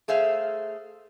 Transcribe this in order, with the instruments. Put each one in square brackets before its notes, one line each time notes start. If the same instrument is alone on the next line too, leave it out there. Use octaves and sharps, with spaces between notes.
[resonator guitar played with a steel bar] A3 G#4 C5 E5 F5